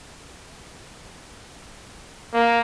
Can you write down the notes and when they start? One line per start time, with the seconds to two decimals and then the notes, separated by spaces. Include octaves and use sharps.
2.33 A#3